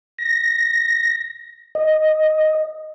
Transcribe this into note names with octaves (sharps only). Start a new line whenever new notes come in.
A#6
D#5